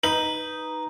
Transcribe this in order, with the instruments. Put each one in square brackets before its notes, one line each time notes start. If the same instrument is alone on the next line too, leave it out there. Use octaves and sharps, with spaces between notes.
[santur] D#4 [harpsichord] B4 [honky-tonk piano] F#7